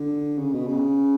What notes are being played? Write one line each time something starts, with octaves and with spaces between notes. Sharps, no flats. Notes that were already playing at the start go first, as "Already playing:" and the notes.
Already playing: D3
C#3
B2
C#3